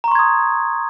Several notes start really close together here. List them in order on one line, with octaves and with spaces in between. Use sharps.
A#5 C#6 C6 G#6 D#6